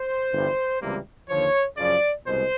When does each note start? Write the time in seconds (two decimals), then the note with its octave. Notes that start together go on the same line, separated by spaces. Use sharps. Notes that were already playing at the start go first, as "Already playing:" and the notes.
Already playing: C5
0.31 G1 G2 E3 G3
0.81 C#2 C3 E3 G3 A#3
1.29 D#2 D3 F3 C#5
1.78 F#2 C#3 F3 D5
2.27 C2 B2 G#3 C5